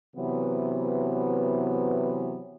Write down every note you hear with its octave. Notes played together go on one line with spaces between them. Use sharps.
C3 E3 F#3 B3